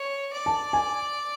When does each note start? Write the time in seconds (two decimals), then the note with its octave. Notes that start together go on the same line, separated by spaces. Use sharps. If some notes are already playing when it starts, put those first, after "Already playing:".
Already playing: C#5
0.33 D5
0.46 A5
0.73 G#5